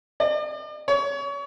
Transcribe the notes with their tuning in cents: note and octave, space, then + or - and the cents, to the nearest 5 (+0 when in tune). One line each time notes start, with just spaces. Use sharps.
D5 +45
C#5 +30